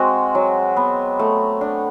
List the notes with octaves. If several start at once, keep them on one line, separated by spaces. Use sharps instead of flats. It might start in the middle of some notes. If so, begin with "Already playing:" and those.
Already playing: G#3 C4 F#4
F#3
B3
A3
D4